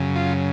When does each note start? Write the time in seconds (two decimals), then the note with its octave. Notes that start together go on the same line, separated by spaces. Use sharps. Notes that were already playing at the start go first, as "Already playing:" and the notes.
Already playing: F#2 C#3
0.16 F4